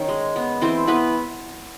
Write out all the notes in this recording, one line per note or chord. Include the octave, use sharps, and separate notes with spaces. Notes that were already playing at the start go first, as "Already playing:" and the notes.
Already playing: D#3 C#4 C#5
G#3
B3
E3 C4 C5
E3 B3 B4